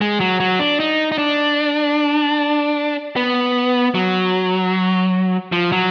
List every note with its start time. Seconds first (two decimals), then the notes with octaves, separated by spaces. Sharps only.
0.01 G#3
0.20 F#3
0.40 F#3
0.59 D4
0.80 D#4
1.12 D#4
1.18 D4
3.16 B3
3.95 F#3
5.52 F3
5.72 F#3